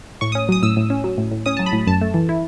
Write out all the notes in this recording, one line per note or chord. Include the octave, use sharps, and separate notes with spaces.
A2 C#6
C#4 D#6
F#3 D#6
A2 E6
A2
C#4
F#3
A2
A2
C#4 D#6
F#3 A5
B5
A2
F#2 A5
A3
E3
E4